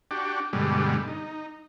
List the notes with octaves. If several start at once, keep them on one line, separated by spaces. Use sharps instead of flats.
D4 F#4 G4
G2 B2 D3 G3 G#3
D#4